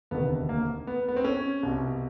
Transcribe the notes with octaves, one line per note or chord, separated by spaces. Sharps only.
E1 D2 C3 D#3 B3
A#3
B3
B3
C4
C#4
C2 B2